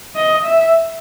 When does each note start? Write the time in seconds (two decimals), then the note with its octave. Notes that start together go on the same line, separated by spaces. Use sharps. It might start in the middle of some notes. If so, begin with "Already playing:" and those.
0.16 D#5
0.45 E5